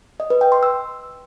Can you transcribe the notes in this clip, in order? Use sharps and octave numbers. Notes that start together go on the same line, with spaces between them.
D#5
B4
G5
C6
E6